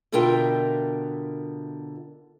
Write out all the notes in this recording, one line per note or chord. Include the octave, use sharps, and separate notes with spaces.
B2 D3 F4 A#4 E5 G5